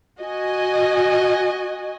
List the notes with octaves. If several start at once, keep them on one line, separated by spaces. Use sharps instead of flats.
F#4 D#5 G#5